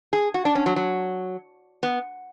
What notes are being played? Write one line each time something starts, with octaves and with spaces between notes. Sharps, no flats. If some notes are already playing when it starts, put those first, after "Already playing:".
G#4
F#4
D4
C#4
F#3
F#3
B3